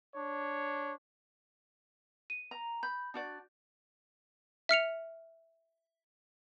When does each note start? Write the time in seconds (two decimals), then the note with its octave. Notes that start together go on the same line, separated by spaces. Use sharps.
0.15 D4 C#5
2.30 D#7
2.51 A#5
2.83 B5 G6
3.14 D4 F#4 D5
4.69 E5 F6 C#7 F7